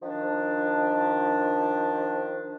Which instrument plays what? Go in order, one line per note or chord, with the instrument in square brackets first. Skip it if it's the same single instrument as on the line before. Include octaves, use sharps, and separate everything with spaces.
[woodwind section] D#3 F3 D4